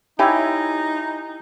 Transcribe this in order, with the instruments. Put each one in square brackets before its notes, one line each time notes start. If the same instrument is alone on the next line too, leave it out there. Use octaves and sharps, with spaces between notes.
[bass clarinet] D#4 [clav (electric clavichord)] E4 G5 [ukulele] G4 C#5 G#5